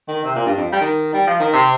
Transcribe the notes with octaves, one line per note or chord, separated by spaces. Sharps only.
D#3
C3
A#2
G2
F2
G3
D#3
G3
F3
D#3
C3